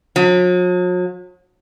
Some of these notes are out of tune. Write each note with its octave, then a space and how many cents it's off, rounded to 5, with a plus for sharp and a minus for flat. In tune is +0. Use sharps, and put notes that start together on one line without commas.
F#3 -45